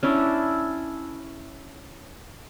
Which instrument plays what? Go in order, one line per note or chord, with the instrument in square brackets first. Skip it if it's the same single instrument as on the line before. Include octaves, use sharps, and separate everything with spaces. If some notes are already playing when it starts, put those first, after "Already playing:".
[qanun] C#4 D4 E4